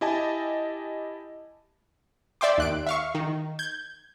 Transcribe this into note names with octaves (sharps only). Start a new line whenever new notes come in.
E4 G4 D#5 G#5 A5
D5 E5 G5 C6 D6
D#2 F#6 D7
E5 F5 C#6
D#3
G6 G#6